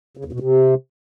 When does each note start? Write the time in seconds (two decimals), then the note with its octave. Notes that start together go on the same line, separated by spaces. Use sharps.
0.17 C#3
0.25 E2
0.33 B2
0.40 C3